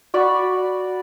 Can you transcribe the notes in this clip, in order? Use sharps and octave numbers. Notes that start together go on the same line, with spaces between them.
F#4 D5 B5 C#6